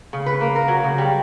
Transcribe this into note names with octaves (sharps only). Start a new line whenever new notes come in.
C#3
B4
A#3
A#4
F#3
C#3
G3